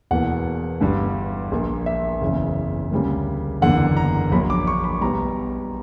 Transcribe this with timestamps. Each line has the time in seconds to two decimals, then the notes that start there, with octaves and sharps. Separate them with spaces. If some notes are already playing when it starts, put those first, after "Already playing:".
0.11 E1 E2 B2 A#3 F#5
0.81 G1 G2 D3 G3
1.51 A#1 A#2 A#3
1.86 E5
2.21 F#1 E2 C#3
2.91 D2 C#3 G3 A#3
3.62 F#1 E2 D3 A#3 F#5
3.97 A#5
4.31 A#1 A#2 F#3 A#3 B5
4.50 D6
4.67 C#6
4.84 B5
5.01 B1 B2 G3 A#5